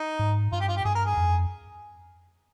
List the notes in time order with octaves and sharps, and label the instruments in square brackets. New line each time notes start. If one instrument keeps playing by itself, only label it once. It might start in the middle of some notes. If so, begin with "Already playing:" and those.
Already playing: [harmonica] D#4
[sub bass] G#2
[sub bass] G2 [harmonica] F4
[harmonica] G4
F4
G4
[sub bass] G2 [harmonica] G#4
[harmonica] A#4
G#4
[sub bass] F2